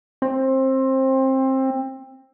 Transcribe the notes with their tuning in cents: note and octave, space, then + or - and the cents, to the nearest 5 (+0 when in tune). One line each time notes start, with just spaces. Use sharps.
C4 +20